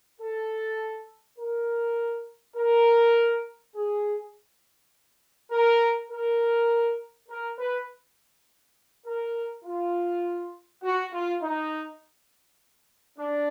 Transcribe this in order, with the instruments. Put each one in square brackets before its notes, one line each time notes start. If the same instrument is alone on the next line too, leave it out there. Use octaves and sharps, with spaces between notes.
[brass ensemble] A4
A#4
A#4
G#4
A#4
A#4
A#4
B4
A#4
F4
F#4
F4
D#4
D4